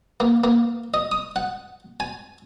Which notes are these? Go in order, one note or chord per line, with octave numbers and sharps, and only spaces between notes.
A#3
A#3
D#5
D#6
F#5
G#5